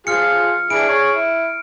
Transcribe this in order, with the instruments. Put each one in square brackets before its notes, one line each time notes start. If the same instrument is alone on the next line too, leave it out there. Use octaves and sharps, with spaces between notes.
[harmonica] F3 F4 G#4 [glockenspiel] F6 C#7
[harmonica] D4 E4 G#4 [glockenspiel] D7
[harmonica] G#4 C#5
E4